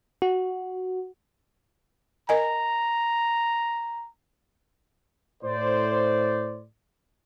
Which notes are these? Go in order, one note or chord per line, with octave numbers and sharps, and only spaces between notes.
F#4
A#4 D#5 G#5 A#5
A2 C5 D5